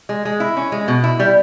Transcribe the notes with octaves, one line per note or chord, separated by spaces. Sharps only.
G#3
G#3
E4
C#4
G#3
B2
E4
G3